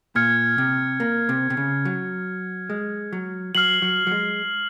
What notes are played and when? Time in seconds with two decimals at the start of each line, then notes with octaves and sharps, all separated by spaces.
0.15 A#2 F6 G#6 C#7
0.58 C3
1.00 A#3
1.29 C3
1.50 C3
1.57 C#3
1.85 F#3
2.70 G#3
3.12 F#3
3.55 F#3 F6 C7 F#7
3.82 F#3
4.07 F#3
4.11 G#3